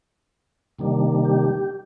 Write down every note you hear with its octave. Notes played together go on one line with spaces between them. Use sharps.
C3 D#3 G3 A#3 D4
G4